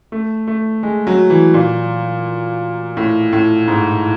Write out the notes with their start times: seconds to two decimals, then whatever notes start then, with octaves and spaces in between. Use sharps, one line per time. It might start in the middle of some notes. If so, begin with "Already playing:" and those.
0.12 A3
0.47 A3
0.83 G#3
1.07 F#3
1.30 E3
1.54 A#2
2.97 A2
3.33 A2
3.68 G#2